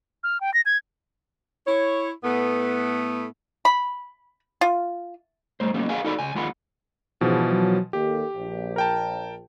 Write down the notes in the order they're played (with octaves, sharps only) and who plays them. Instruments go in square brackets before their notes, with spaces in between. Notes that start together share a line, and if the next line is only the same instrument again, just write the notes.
[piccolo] F6
G5
A#6
G#6
[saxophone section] E4 C#5
A2 A3 B3
[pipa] B5
F4
[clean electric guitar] G3 A3 C5
F#3 G3 A#3 B3 C#4
G#4 B4 F5 F#5 G#5
D#4 F#4 A4 D5 G#5 B5
C#2 G#5
D#2 G#3 F4 F#5 B5
[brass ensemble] G#2 C#4 [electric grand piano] B2 E3 F3
[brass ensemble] F#3
[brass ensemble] D#2 A4 [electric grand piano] G4
[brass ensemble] A#1
[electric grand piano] A#4 G5 A5